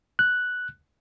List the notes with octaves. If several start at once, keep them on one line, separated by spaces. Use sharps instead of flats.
F#6